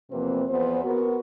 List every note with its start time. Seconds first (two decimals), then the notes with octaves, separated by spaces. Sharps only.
0.11 E2 C3 F3 A#3 C4 B4
0.49 E2 F3 B3 C5
0.83 B3 F#4 A#4